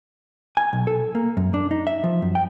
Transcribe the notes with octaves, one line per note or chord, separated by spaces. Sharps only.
G#5
B1
A4
A#3
F#2
D4
D#4
E5
F3
F#2
G5